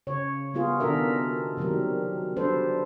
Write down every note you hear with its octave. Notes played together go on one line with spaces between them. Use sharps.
C#3 C#5
G3 B3 F4 G#4
B2 D#3 D4 A4 A#4 E5
C3 D#3 F#3 G3 A#4
F#3 G3 D4 A4 B4 C5